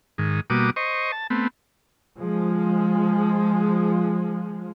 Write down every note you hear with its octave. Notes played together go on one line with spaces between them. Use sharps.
G#2 D#3
B2 G3 A#3 F#4 D6 D#6
C5 D#5 C#6
A5
A3 B3 C4
F3 G#3